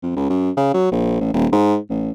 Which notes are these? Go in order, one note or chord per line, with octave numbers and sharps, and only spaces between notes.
F2
C#2
F#2
C#3
F#3
A#1
A1
D#1
G#2
A1